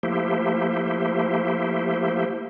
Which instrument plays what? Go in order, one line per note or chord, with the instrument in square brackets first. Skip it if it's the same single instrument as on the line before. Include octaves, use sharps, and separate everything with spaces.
[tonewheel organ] F3 A3 A#3 E4 G4 C5